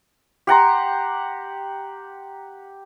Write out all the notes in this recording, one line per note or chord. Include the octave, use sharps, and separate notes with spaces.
G4 F#5 A#5 C6